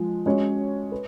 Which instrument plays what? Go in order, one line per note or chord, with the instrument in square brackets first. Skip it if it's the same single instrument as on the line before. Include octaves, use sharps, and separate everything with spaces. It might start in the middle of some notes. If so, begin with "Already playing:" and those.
Already playing: [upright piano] F3 G#3
G#3 C#4 F#4 C#5
B4